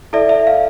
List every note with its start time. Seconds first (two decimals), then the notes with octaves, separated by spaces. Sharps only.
0.13 E4 A4 D5 E5
0.29 E5
0.47 F5